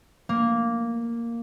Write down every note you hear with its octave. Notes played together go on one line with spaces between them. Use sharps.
A#3